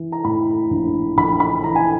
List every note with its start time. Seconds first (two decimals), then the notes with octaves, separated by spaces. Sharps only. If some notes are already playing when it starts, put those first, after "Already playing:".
Already playing: E3
0.12 A#5
0.24 A2 B5
0.71 A#1
1.17 A#1 B5
1.40 B5
1.63 E3 A#5
1.76 G#5